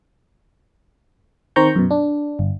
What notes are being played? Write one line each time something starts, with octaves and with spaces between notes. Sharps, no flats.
D#3 C4 C5 A#5 C#6 G6
F#2 B2
D4
G1